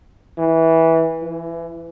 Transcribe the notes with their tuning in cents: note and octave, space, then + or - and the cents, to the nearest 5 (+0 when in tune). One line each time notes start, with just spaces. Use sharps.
E3 -15
E3 +25